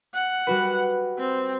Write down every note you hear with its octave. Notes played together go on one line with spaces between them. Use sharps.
F#5
G3 F#4 B4
C4